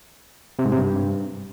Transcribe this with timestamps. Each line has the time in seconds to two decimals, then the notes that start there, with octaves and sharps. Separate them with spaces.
0.59 C3
0.65 G#2
0.72 C3
0.78 G2